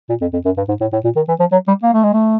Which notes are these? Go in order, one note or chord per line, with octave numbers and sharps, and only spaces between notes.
A#2
F2
F2
F#2
G2
G#2
A2
A2
A#2
D#3
E3
F3
F#3
G3
A#3
A3
G#3
A3